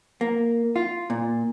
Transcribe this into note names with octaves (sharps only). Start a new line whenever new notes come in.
A#3
F4
A#2